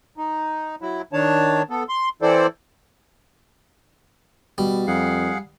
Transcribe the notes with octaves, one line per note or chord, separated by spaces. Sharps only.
D#4
F#3 E4
D#3 D4 C#5 A5
B3 A4
C6
E3 C4 E4 A4 C5 D5
B2 G3
F2 G#4 F5 F#5